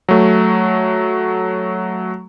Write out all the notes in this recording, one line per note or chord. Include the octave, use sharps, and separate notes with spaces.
F#3 A3